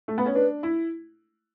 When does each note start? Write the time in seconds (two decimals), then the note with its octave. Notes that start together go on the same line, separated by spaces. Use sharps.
0.08 A3
0.18 B3
0.26 C#4
0.35 D4 B4
0.63 E4